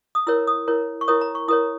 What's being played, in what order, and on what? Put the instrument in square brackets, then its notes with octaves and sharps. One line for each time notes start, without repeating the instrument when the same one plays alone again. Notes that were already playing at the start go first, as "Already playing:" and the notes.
[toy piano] D#6
E4 A#4 C#5 E6
D#6
E4 A#4 C#5
C#6
E4 A#4 C#5 D#6
A#5
C#6
E4 A#4 C#5 D#6